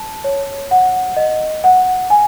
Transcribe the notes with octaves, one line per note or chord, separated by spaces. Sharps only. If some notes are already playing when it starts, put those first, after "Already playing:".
Already playing: A5
C#5
F#5
D#5
F#5
G#5